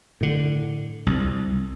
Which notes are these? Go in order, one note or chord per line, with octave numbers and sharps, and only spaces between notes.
A2 D3
C2